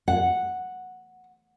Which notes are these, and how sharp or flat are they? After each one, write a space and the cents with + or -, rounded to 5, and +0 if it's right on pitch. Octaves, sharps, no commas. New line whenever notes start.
F#5 -5